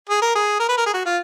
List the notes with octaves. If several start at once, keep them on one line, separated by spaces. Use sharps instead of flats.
G#4
A#4
G#4
A#4
B4
A#4
G#4
F#4
F4